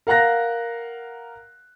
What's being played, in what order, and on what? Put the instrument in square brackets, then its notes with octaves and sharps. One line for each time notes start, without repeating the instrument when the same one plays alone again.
[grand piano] A#4 F5 F#5 A#5 F#6 A#6